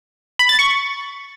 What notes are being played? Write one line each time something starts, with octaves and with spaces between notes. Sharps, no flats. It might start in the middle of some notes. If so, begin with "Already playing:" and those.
B5
A6
C#6